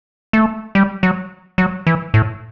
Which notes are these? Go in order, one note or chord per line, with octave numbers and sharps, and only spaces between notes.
A3
G3
F#3
F#3
E3
A2